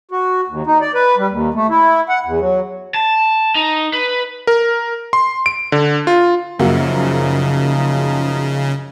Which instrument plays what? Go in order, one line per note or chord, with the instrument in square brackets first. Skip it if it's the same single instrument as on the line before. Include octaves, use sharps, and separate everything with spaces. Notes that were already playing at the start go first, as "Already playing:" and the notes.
[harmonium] F#4
D#2
D#4
D5
B4
G3
D#2
A3
E4
F#5
E2
F#3
[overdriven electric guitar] A5
D#4
B4
[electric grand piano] A#4
C6
D7
D3
F4
[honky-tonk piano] F#2 A#3 F#4 [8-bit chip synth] C#3 [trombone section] F3 D#4